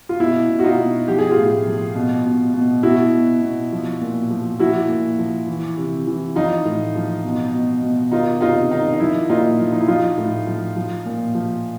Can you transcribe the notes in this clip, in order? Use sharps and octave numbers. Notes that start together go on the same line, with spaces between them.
F4
B2 E4
B2
F#4
D#4 F4
B2
F3 G4
G#4
F4 G4
A2
F3
B2
B2
B2
B2 E4 F#4
B2
B2
F3
A#2
F3
F3 E4 F#4
A#2
F3
E3
C3
E3
F3 D#4 F4
A2
F3
B2
B2
B2
D#3 D#4 F4
C3 D#4 F4
D#3 D#4
D#4
F3 E4
A#2 D#4 F4
F3
D#4
E4
F3 D#4 F4
A2
F3
F3
A#2
F3